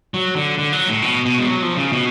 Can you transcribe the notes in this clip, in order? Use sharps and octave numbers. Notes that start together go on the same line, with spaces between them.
F#3
D3
D3
F#3
A2
B2
B2
G#3
F#3
F3
C#3
B2